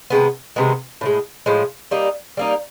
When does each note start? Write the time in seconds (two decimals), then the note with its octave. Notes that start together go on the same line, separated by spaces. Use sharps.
0.10 C3 D#3 G#3 B3
0.56 C3 D#3 G#3 B3
1.01 A2 F3 G#3
1.46 A2 F3 G#3
1.91 G3 A#3 D#4
2.37 G3 A#3 D#4